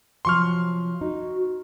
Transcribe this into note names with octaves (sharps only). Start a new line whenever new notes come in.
C3 F3 F#3 C6 C#6 F6
D#4 F#4